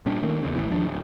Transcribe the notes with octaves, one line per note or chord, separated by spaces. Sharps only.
A#2 G3 C#4 D4
D#3 A3 A#3
E2 C#3
G#1 A2 E3
D#2 F3 D4
D1